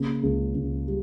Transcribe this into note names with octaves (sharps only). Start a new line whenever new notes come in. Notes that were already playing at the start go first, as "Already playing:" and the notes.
Already playing: C#3 A#3
C#2
C#2
G3